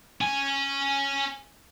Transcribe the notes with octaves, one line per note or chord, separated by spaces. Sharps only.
C#4 G#5